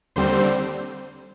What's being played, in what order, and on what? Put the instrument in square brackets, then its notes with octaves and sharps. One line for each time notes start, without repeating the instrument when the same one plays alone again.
[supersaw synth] D#2 D3 G3 C4 C5